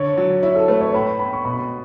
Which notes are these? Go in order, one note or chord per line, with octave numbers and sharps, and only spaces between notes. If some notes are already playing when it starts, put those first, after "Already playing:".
Already playing: D3 D4 C#5
F#3
E4 C#5
A4
A3 B4
C#5
A2 B5
B3 B5
C#6
B2 B5